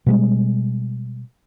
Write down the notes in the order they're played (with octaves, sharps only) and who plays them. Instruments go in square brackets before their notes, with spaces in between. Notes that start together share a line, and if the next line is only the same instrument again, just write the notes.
[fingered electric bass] B2 G3 G#3